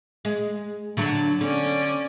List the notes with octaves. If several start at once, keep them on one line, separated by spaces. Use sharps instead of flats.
G#3
D3 F#3 D4
D3 C#4 D5